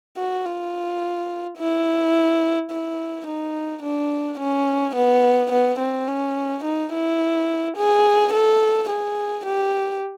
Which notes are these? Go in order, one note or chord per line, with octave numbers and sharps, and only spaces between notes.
F#4
F4
E4
E4
D#4
D4
C#4
B3
B3
C4
C#4
D#4
E4
G#4
A4
G#4
G4